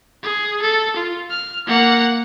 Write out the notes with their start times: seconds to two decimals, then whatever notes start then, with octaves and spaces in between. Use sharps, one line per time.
0.23 G#4
0.61 A4
0.96 F4
1.30 F6
1.67 A#3 F#5